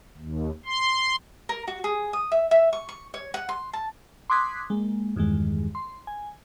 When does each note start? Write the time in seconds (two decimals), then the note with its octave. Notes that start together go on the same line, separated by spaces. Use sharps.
0.18 D#2
0.65 C6
1.49 A#4
1.68 F#4
1.84 G#4
2.13 D#6
2.32 E5
2.51 E5
2.73 C#6
2.89 C#6
3.14 C#5
3.34 F#5
3.49 C6
3.73 A5
4.30 C6 D6 D#6 F#6 G#6 B6
4.70 G#3 A#3
5.16 E2 G2 D#3 G#3
5.75 C6
6.07 G#5